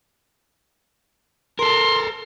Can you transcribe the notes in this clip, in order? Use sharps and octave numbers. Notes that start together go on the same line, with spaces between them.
A4 A#4 C6